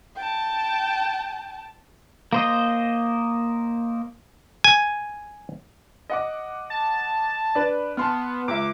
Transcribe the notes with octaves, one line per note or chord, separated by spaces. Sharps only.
G5 A5
A#3 C5 D#5
G#5
D#5 F#5 D6
A5
D4 B4
B3 A5 C6 F6
C#2 E5 D6